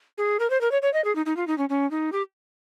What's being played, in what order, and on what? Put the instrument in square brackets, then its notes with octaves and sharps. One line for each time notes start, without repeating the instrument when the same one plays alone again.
[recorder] G#4
A#4
C5
A#4
C#5
C#5
D#5
G#4
D#4
D#4
F4
D#4
C#4
C#4
D#4
G4